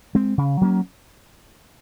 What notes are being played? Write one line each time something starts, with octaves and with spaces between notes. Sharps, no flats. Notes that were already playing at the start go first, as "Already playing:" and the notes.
G#3 C4
C#3
F#3 A#3 C#4